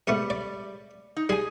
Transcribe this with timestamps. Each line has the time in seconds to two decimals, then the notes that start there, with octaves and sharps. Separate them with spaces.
0.07 G#2 G3 A3 B3
0.30 D5
1.17 D#4
1.29 G3 G#4 G#5